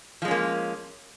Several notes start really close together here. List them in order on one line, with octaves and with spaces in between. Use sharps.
F3 G#3 C#4 A#3